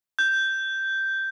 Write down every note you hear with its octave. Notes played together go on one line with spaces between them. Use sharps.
G6